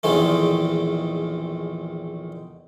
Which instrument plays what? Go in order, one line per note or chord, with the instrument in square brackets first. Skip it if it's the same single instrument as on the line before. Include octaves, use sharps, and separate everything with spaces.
[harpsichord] A#1 E2 D#3 G#3 A3